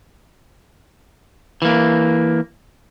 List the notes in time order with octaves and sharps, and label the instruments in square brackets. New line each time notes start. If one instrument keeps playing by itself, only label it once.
[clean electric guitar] E3 A#3